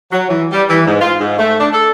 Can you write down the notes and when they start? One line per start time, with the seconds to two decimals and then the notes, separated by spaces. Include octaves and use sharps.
0.12 F#3
0.29 E3
0.52 G3
0.69 E3
0.86 G#2
1.00 F4
1.20 G#2
1.38 A3
1.59 D4
1.73 A4